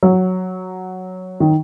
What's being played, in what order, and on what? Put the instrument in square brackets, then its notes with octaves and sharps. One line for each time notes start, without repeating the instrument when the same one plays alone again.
[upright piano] F#3
D#3